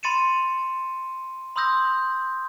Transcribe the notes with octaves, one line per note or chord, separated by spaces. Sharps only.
B5 C6 A6 C#7 D#7 E7
B5 C6 D#6 E6 G6 A#6